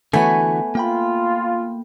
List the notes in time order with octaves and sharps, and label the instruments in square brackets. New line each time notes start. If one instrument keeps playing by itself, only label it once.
[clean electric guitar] D3 E3 F#4 [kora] A3 B3 C#5 [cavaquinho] G#5
[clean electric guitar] A#3 G5 B5 [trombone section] F4